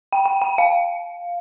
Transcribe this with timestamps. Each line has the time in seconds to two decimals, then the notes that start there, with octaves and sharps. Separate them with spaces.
0.13 G5
0.26 G5
0.42 G5
0.58 F5